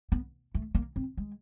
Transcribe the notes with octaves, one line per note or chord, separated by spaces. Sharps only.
B3
A3
A#3
C4
G#3